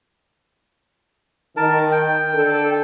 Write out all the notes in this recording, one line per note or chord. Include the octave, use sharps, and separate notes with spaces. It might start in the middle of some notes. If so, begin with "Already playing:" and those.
D#3 A#4 A5
G5
D3 D4 A4